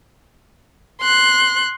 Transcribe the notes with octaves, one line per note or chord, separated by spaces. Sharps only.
C6 F#6